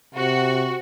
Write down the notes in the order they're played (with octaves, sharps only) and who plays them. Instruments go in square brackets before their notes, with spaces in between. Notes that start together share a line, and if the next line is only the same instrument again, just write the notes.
[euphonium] C3 [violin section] F#4